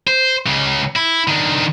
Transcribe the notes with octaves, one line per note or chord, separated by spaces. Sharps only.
C5
C#2 C#3
E4
D#3 D4